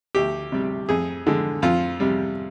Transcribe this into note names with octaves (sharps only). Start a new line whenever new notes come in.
D2 G4
C3 G3
F2 G#4
D3 G#3
F2 F4
C3 G3